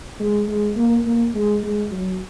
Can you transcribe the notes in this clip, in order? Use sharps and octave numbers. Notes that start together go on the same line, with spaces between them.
G#3
G#3
A#3
A#3
G#3
G#3
F#3